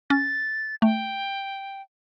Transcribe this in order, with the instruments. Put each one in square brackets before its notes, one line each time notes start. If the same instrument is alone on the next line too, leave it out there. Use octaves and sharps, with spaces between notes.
[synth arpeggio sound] C#4 [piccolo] A6
[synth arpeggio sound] A3 [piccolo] G5